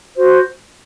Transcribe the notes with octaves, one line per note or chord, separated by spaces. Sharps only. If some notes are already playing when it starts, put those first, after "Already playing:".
F#4 C5